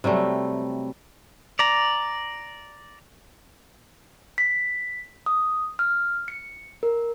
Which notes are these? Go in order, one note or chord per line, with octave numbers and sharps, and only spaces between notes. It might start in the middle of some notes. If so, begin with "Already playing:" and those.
C3 F#3 G3 A3
D5 A#5
B6
D#6
F6
C#7
A#4